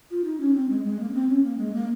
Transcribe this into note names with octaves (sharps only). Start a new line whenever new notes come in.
F4
D#4
C#4
C4
G#3
G#3
A#3
C#4
C4
C#4
A#3
G#3
A#3